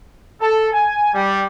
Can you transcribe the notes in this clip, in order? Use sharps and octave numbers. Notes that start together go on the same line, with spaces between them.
A4
G#5
G3